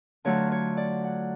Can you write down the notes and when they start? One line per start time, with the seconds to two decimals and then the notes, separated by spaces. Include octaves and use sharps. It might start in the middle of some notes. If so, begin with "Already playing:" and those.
0.25 D3 F#3 A3 F4 C#5
0.52 C#5
0.77 D5
1.04 F#5